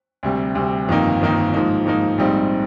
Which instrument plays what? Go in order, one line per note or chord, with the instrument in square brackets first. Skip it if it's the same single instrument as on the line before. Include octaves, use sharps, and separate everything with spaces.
[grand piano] D2 C3 G3
D2 C3 G3
G1 F2 D#3 A#3 D#4
G1 F2 D#3 A#3 D#4
G#2 F3 A#3 D#4
G#2 F3 A#3 D#4
A#1 G#2 G3 C4 D#4